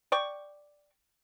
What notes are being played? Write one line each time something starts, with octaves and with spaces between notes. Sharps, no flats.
D5 G5 C#6